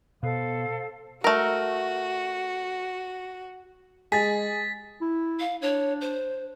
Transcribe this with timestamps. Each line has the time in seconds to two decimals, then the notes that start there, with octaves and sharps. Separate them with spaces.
0.23 B2 B3 A4 C5 F5
1.24 A3 F#4 A#4
4.12 G#3 G#4 A6 B6
5.01 E4
5.40 F5
5.62 D4 C#5
6.01 C5